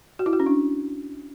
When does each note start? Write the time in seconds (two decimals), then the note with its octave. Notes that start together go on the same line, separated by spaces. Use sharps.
0.19 F#4
0.26 E4
0.33 F#4
0.40 C#4
0.46 D4